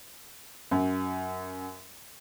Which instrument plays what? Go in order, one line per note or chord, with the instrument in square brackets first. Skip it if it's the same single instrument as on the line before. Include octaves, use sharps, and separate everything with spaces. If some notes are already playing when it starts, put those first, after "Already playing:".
[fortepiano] F#2